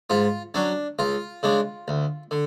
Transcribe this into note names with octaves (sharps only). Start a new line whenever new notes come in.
G#2 F4
F#3 C#4 D4
C#2 F4
C#3 G#3 D4
D2
D3